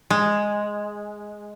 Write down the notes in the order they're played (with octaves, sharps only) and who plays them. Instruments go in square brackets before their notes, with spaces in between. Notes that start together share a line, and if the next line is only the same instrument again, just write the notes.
[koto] G#3